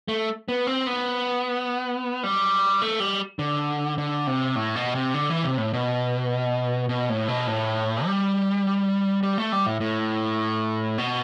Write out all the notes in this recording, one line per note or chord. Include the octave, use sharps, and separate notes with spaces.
A3
B3
C4
B3
G3
A3
G3
D3
D3
C3
A2
B2
C3
D3
E3
C3
A2
B2
B2
A2
B2
A2
G3
G3
A3
G3
A2
A2
B2